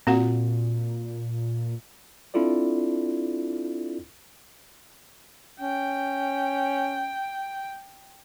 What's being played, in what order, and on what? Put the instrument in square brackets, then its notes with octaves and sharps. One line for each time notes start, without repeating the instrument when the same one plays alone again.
[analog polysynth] A#2 [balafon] C4 F#4 F#5
[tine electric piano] C4 D4 E4 F4 A4 D5
[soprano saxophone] C#4 [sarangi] G5